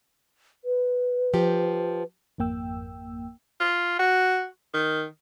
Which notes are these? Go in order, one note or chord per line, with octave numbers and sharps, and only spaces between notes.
B4
F3 G4
G#1 F2 A#3 G5 E6
F4
F#4
D#3